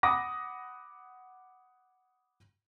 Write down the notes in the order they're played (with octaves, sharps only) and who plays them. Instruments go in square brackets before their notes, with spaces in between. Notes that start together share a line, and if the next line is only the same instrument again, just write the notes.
[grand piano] F#5 B5 D6 D#6 A#6